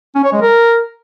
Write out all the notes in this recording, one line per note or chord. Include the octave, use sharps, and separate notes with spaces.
C#4
C#5
G#3
A#4